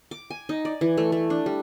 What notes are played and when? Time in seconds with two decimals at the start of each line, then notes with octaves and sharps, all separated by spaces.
0.11 D6
0.30 G#5
0.49 D#4
0.65 D5
0.81 E3
0.97 A3
1.12 A3
1.30 D4
1.46 G3